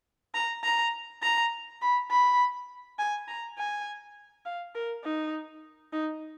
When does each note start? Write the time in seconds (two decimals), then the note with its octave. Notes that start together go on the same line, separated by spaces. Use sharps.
0.34 A#5
0.64 A#5
1.23 A#5
1.82 B5
2.11 B5
2.99 G#5
3.28 A#5
3.58 G#5
4.46 F5
4.75 A#4
5.04 D#4
5.93 D#4